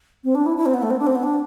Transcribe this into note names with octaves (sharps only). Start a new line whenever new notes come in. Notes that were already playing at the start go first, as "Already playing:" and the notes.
C4
D4
E4
E4
C4
B3
A3
C4
D4
C4
B3
D4